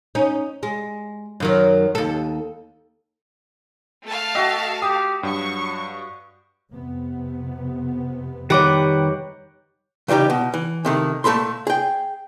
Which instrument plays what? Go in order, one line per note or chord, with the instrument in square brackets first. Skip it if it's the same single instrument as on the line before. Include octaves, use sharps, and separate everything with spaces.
[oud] C#4 D#4
G#3
F#2 D#3 F#3
D#2 A4
[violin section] A3 F5 A5
[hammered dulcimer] F#4 E5 [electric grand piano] D#5 G5 D#6
[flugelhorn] G4 [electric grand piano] D#6
[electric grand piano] G2 [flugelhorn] F#3 [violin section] C#6
[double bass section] F2 C3 B3
[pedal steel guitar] D#3 G3 B4 [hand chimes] G4 C#5 [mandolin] F#5 D6
[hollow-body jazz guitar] C#3 E3 G3 D#4 G4
B2
E3
C3 D#3 A3
A#2 A3 A4 B5 C6
G#4 G5